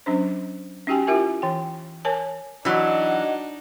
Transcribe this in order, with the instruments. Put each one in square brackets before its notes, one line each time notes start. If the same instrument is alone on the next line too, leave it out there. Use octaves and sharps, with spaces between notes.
[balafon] F#3 C#4 D4 C5
C#4 D#4 F#4 G4 G5 G#5
E4 F4 G4 A#4 E5 G#5
E3 G5
A#4 C#5 G#5 A5
[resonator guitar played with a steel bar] E3 F#3 [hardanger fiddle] D4 D#4 [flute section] D#5 F#5